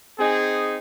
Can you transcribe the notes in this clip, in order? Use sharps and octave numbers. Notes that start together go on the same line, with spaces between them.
C4 D#4 G#4